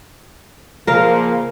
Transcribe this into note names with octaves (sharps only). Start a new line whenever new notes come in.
A#2 C#3 F3 A#3 A#4 F5